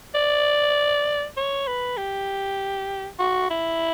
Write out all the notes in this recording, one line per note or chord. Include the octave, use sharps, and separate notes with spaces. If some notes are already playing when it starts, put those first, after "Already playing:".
D5
C#5
B4
G4
F#4
E4